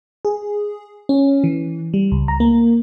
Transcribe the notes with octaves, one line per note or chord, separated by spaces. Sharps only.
G#4
C#4
E3
G3
C#2
A#5
A#3